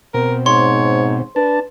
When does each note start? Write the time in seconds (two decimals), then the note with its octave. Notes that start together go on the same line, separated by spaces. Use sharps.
0.14 B2 C4 A#4
0.46 G#2 C#5 C6
1.36 D4 B4 A5